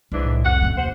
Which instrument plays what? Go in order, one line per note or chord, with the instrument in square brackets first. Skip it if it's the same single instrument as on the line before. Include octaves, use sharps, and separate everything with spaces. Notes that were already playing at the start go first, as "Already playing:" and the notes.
[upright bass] C2 [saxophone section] G#2 E3 D4
[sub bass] A2
[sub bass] F2 [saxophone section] F#5
[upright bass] C3 C#4
[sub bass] D#2 [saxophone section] C5 F#5